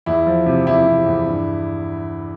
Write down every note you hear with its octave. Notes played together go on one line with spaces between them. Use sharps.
E2 E4
F3
C3
E2 E4
C3
E2
G2